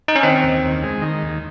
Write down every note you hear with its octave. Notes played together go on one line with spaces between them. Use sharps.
D#4
C#4
D#3 C4
D#2
D#2
G#3
D#3
D#2